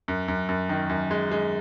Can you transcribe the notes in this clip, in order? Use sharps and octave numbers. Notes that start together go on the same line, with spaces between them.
F#2
F#2
F#2
D#3
F#2
G#3
G#3